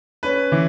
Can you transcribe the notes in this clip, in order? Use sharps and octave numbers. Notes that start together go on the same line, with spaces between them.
C#4 B4
E3